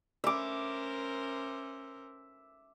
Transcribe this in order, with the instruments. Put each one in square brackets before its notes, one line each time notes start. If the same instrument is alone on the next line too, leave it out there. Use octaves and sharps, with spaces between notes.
[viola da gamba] C#4 A#4 C5 [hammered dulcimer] E5 D6